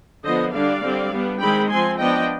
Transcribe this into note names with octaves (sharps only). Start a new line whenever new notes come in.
D3 F3 B3 C5 D#5
D3 G3 D4 D5 F5
D3 G3 C4
G3 B3 D4
D#3 G#3 C4 G5 B5
F3 C4 G#5 C6
F3 B3 D4 D#5 G5